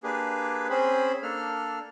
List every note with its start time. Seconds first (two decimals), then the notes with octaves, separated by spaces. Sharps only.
0.03 A#3 D4 G4 G#4 B4
0.70 C4 C#4 G#4 C5 B5
1.23 A#3 D4 A4 F6